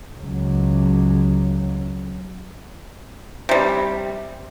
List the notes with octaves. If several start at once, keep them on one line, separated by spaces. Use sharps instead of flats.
C#2 F#3
C3 G3